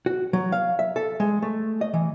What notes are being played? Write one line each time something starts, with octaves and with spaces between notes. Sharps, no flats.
F#4
F#3
F5
E5
A4
G#3
A3
D#5
E3